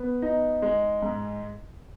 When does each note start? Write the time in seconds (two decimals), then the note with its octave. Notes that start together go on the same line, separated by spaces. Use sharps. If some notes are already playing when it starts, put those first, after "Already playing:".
Already playing: B3
0.22 D#4
0.62 G#3
1.02 G#2